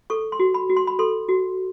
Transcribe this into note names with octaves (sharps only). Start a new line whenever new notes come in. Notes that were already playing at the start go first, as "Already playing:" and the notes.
A4 C#6
C6
F#4
B5
F#4
C6
B5
A4 C6
F#4